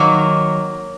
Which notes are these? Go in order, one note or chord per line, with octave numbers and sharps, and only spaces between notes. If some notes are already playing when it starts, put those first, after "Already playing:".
Already playing: D#3 F#3 A#3